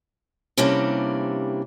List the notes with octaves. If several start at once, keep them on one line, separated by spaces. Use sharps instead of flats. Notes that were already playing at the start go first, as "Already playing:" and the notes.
C3 E3 G3 A#3 C#4 D4